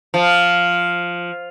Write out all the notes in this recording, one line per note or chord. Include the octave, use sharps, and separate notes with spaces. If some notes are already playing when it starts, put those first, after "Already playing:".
F3